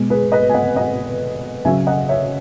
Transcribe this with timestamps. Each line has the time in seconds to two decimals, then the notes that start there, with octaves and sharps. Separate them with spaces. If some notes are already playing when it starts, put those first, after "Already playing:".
Already playing: B2 G#3
0.10 G#4 B4
0.32 B4 D#5
0.49 G#5
0.54 D#5 F#5
0.76 D#5 F#5
1.65 C#3 F#3 E5 G#5
1.87 D#5 F#5
2.09 C#5 E5